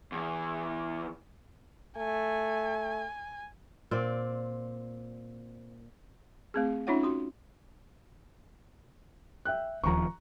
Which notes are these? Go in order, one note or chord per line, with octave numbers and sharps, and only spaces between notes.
E2 E3
A3 G#5
A#2 C4 D5
A3 C4 G#4
C#4 D#4 F4 C#5 E5 F#5
F#4 C6
E5 G5 F#6
D1 D#2 F3 A#5 C#6